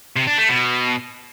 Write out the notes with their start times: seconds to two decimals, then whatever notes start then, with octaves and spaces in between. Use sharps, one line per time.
0.16 C3
0.27 D4
0.38 A3
0.48 B2